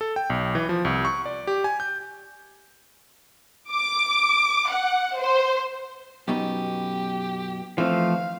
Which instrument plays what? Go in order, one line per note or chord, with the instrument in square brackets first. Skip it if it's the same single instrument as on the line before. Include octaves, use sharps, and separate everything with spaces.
[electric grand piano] A4
G5
B1
E3
F3
C2
C#6
D5
G4
G#5
G6
[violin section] D6
F#5
C5
[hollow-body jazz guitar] F#2 B2 D#4 [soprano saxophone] G4
[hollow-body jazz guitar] E3 C4 [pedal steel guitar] F3 A3 [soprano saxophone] F5